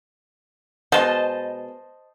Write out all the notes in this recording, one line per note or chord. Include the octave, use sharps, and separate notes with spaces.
B2 G#3 C5 D#5 A5